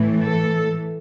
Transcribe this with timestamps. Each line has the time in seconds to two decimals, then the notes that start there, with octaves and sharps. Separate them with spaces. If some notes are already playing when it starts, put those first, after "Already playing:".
Already playing: A2 E3 A3
0.22 A4